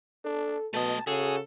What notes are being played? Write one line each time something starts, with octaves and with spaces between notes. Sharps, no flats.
D4 A4
B2 A3 D#5 A5
C#3 F#4 G#4 A4